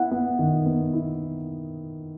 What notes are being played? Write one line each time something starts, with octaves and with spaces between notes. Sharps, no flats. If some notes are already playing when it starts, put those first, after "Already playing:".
Already playing: B3 E4 F#5
B3
D#3
B3
E4